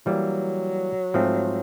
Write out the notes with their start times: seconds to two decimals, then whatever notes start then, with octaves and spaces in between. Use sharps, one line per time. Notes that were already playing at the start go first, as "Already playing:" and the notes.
0.06 E3 F#3 G3 A#3
1.14 G#2 F3 A3 C4